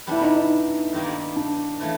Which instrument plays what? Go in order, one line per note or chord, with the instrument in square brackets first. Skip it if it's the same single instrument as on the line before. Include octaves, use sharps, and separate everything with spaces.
[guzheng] G3 B3 D4 [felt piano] E4
[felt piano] D#4
D#4
[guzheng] G2 D#3 G3 A#3
[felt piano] D4
[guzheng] C#3 E3 A3